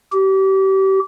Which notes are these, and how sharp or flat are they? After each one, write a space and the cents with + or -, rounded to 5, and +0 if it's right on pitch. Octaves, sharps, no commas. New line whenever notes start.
G4 -30